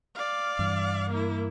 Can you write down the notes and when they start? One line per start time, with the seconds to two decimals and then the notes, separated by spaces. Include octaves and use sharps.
0.15 D5 F5
0.59 G2 E3
1.10 A#3 E4